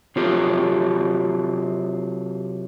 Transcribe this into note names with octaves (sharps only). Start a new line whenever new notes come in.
C3 F#3 F4 G4 A4